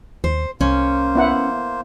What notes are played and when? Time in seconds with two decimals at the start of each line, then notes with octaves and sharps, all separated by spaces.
0.24 D#2 C5
0.61 C2 A#3 C#4 C5
1.15 B3 E4 F#5